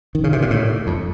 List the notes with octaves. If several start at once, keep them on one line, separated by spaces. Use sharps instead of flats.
D#3
C#3
C3
A#2
A2
F2